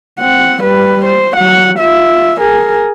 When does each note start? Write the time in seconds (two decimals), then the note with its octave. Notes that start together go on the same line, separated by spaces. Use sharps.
0.20 C4 F#5
0.63 G3 B4
1.06 C5
1.37 F#3 F#5
1.79 F4 E5
2.40 G#4 A#4